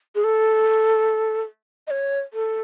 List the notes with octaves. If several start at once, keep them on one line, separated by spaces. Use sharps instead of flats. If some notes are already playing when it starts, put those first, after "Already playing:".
G#4
A4
D#5
C#5
A4